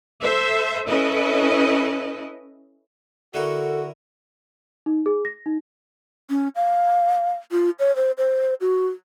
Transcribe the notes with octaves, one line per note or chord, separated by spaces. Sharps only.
A4 C5 E5
C#4 E4 A4 B4 D#5
D3 E4 F#4 A4 A#4
D#4
G#4
A#6
D#4
C#4
F5
F4
C#5
C5
C5
F#4